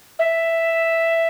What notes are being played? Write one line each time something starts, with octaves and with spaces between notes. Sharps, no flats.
E5